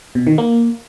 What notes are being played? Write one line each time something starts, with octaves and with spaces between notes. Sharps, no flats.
B2
D#3
A#3